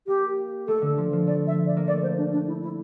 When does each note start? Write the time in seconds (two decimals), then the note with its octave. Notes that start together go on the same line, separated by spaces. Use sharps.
0.07 A#3 G4
0.67 A3 A4
0.82 D3
0.98 F3
1.13 F3
1.27 A3 D5
1.47 E5
1.67 D5
1.76 A#3
1.88 A3 D5
2.02 C5
2.17 D4
2.32 D4
2.47 E4
2.63 E4